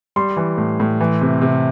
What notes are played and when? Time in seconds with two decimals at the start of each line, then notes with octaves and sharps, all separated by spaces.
0.16 G3 C6
0.37 E3
0.58 A2
0.80 A2
1.01 E3
1.22 C3
1.42 C3